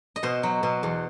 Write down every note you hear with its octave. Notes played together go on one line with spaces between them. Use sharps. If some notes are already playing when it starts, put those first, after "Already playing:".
D#5
B2 C5
F#3
B2
E2